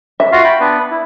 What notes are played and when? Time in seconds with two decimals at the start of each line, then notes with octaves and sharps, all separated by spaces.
0.20 E5
0.32 F4 F#4 F5
0.44 G5 B5
0.60 B3 D4 B4
0.91 E4